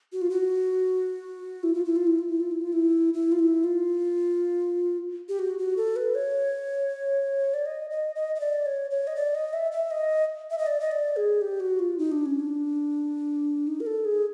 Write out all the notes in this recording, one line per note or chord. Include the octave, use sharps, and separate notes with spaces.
F#4
F4
F#4
E4
F4
E4
F4
E4
F4
E4
F4
E4
F4
E4
E4
F4
E4
F4
G4
F#4
F#4
A4
B4
C#5
D5
D#5
D#5
D#5
D#5
D5
C#5
C#5
D#5
D5
D#5
E5
E5
D#5
E5
D#5
D5
D#5
D5
G#4
G4
F#4
F4
D#4
D4
C#4
D4
D#4
A#4
A4
G#4